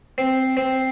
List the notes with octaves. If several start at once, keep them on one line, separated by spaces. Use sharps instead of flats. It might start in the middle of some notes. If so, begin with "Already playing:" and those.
C4
C4